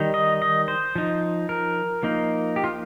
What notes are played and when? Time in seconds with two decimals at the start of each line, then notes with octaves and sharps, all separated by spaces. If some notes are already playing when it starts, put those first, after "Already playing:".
Already playing: D#3 G3 D#4
0.14 D#5
0.42 D#5
0.68 C5
0.96 F3 D#4
1.49 A#4
2.03 F3 A#3 D#4
2.56 G4
2.64 F4